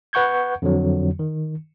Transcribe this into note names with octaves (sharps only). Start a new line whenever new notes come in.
B4 F#5 C#6 G6 G#6
F2 D3 F#3
D#3